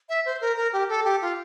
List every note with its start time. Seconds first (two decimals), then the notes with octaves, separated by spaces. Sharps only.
0.09 E5
0.26 C5
0.41 A#4
0.57 A#4
0.73 G4
0.89 A4
1.05 G4
1.22 F4